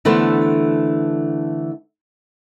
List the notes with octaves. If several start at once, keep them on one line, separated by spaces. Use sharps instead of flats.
D3 E3 A3 B3 D4 C5